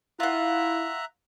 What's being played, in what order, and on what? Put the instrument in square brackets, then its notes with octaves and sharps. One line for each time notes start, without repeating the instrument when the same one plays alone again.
[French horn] E4 [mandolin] F4 F#5 [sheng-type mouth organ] E5 A#5 F#6